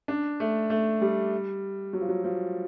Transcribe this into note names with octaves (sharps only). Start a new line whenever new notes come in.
D4
A3
A3
G3
F#3
F3
F#3
F3